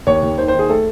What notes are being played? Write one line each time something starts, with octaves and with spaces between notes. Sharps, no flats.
D#2 C#5
D#2
D#3 C5
C5
D#3
G#4
A3 A4